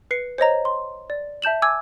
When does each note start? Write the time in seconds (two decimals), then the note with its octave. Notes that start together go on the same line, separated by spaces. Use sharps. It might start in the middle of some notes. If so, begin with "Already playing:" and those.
0.11 B4 C7 C#7
0.38 C5 C#5 D#5 A#5
0.65 C6
1.10 D5
1.42 E5 A5 G6 E7 F#7
1.62 G#5 D6 E6 G#6